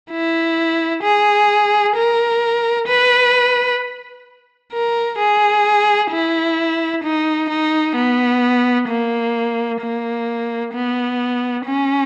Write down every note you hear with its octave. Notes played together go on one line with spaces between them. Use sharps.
E4
G#4
A#4
B4
A#4
G#4
E4
D#4
D#4
B3
A#3
A#3
B3
C#4